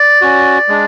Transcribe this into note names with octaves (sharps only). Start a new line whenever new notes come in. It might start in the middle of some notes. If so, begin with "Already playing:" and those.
Already playing: D5
C#4 F#4
G#3 D4